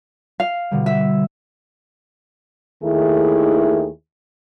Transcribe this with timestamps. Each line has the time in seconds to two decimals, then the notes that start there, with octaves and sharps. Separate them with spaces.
0.40 F5
0.71 B2 D3 G3
0.86 E5
2.83 D#2 D#3 A3 E4 G#4